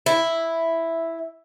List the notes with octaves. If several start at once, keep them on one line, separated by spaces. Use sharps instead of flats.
E4